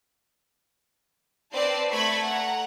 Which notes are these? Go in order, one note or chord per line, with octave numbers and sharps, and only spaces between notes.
C4 B4 D5 A5 C7
A3 B5 C#6 G#6
F#5 A#5